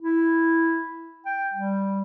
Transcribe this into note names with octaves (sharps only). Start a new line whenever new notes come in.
E4
G5
G3